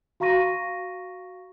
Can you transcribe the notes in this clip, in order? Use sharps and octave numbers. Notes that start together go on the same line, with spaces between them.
F#4 F5 A#5 C#6 A#6 D#7